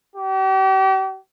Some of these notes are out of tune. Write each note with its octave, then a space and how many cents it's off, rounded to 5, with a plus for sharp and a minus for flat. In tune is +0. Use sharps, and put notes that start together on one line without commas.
G4 -40